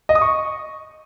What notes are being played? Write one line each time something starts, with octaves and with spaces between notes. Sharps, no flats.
D#5
D#6
C#6